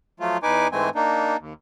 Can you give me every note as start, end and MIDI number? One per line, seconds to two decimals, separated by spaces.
0.20 0.37 53
0.20 0.37 54
0.20 0.37 57
0.20 0.37 65
0.43 0.68 40
0.43 0.68 63
0.43 0.68 71
0.43 0.68 80
0.43 0.68 86
0.72 0.89 44
0.72 0.89 52
0.72 0.89 56
0.72 0.89 57
0.72 0.89 60
0.72 0.89 80
0.95 1.37 58
0.95 1.37 62
0.95 1.37 63
1.39 1.53 39